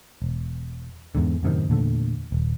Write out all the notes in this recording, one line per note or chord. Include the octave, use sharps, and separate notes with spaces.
E1
E2 G#2 D3
F#2 A2 C3 D#3
E2 A#2 D3 A3
D#1